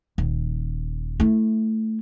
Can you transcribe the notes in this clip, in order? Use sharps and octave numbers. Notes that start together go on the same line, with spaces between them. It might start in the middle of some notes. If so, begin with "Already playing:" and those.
D#1
A3 E4